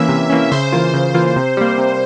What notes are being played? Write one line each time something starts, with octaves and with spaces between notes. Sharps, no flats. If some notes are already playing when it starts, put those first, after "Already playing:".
Already playing: E3 A#3 C#4 E5
C3
E3 A#3 C#4
C#3 C5
E3 A#3 F4
C#3
E3 A#3 F4
C3
G3 A#3
C3